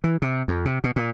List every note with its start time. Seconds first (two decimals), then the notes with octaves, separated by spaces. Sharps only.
0.04 E3
0.22 C3
0.48 F2
0.65 C3
0.84 B2
0.96 A#2